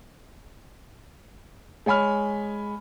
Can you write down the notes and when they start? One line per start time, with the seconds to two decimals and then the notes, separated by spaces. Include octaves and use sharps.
1.86 G#3 C#5 G#5 B5 F6